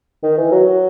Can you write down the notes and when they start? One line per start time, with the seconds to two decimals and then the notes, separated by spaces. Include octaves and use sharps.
0.23 D#3
0.37 E3
0.52 F#3